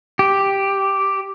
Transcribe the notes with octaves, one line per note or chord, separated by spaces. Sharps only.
G4